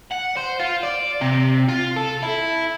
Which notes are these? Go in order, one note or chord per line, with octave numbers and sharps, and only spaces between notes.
F#5
C5
F4
D5
C3
F4
A4
E4